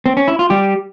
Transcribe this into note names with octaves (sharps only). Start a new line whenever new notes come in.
C4
C#4
E4
F4
G3 G4